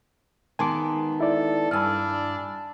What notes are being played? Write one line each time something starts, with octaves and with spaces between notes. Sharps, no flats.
D#3 G#3 B3 G#5 A5 C6 D6
E4 A4 D5
G2 D4 G#5 B5 E6 F6